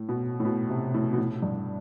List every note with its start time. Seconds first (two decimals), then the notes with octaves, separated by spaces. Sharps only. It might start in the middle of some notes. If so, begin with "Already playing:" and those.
Already playing: A2
0.09 B2
0.40 A2
0.45 B2
0.70 C3
0.94 A2
1.13 B2
1.18 A2
1.42 G2